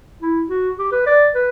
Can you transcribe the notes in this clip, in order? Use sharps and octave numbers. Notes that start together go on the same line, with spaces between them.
E4
F#4
G4
B4
D5
B4